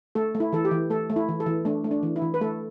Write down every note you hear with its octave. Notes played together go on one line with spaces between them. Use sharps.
A3 A4
A3
E4
E3 A4
G4
E3
A3 A4
A3
E4
E3
A4
E3
A3 D4
A3
D4
E3
E4
E3
B4
A3 A4